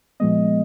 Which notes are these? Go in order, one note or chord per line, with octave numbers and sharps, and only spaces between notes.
A#2 F3 G#3 B3 D#5